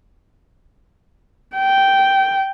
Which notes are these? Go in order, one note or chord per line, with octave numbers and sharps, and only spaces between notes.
G5